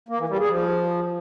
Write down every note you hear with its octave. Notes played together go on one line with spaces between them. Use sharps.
A#3
E3
G3
G#4
F3